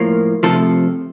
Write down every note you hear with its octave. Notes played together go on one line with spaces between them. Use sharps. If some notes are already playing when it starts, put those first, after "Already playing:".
Already playing: A2 F3 A#3
C3 F3 A3 A4